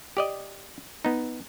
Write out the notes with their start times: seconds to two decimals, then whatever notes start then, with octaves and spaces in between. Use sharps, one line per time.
0.17 G4 D5 D#5
1.05 B3 D#4